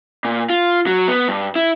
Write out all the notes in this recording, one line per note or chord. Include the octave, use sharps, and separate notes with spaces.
A#2
F4
F#3
B3
G2
E4